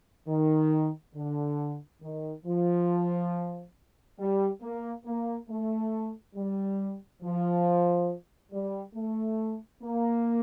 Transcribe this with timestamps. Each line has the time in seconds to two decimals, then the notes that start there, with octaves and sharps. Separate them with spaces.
0.28 D#3
1.15 D3
2.02 D#3
2.45 F3
4.19 G3
4.62 A#3
5.05 A#3
5.49 A3
6.36 G3
7.23 F3
8.52 G3
8.95 A3
9.83 A#3